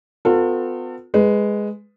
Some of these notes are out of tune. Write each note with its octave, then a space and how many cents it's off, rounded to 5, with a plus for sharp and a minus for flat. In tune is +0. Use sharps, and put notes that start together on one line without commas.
B3 +40 F4 +45 A4 +35
G#3 +0 B4 +10